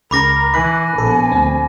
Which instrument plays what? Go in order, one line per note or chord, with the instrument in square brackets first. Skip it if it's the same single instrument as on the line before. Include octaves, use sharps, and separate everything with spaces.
[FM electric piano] C#2 C#3 A#5 [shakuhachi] A#4 [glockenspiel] B5 D6 A#6
[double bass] E3 [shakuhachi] G#5 [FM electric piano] B5 F#6 [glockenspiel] D6
[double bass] A#1 B3 [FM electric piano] A4
[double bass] D2 [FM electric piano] C4